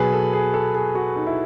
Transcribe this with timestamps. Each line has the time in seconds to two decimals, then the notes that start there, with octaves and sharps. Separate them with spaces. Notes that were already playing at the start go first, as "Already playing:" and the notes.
Already playing: B2 F#3 G#4 B4
0.13 A4
0.33 G#4
0.54 A4
0.75 G#4
0.95 F#4
1.16 D#4
1.27 E4